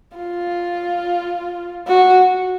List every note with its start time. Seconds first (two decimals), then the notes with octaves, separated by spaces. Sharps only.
0.17 F4
1.88 F#4